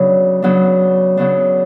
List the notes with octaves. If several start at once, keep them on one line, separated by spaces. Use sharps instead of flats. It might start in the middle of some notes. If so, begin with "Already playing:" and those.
Already playing: C#3 F#3 B3 D4
C#3 F#3 B3 D4
C#3 F#3 B3 D4